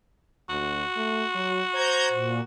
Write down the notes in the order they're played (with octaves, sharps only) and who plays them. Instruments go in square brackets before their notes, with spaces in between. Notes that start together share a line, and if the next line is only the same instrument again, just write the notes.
[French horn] D2 [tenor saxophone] F#4
[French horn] A3
F#3
[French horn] C5 [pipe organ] A#5 G6 G#6
[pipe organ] A#2